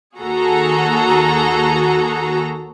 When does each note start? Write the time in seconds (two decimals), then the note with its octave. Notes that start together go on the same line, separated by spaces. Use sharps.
0.19 D#2 F#4 G#4 A4 A#5